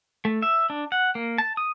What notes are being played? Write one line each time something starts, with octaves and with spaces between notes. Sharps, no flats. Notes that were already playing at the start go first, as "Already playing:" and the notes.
A3
E5
D4
F#5
A#3
A5
D#6